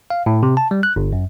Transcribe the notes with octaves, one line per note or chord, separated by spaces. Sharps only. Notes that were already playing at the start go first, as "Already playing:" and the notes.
F5
A2
C3
A5
G3
F#6
G1
F#2